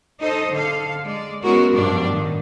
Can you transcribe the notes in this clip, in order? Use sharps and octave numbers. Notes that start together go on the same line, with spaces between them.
D#4 A4 C5 D#5
D3 A4 F5
G#3 D5
G#3 B3 C#4 E4 F#4 A#4
G2 B2 F3 D4 D5
A2 D#3